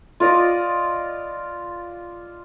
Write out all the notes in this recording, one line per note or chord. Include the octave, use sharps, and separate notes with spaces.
F4 B4 D5 D#5